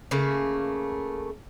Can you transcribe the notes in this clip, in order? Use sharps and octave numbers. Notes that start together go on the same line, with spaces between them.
C#3 A3 A#3